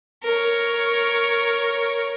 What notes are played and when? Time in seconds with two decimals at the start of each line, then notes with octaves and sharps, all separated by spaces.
0.23 A#4 C#5